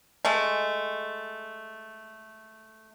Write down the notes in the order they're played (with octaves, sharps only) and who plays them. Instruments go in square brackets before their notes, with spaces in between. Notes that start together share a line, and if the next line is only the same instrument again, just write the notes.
[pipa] G#3 A3